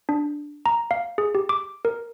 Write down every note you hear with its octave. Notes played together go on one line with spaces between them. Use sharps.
D4
A#5
F5
G#4
G4
D6
A#4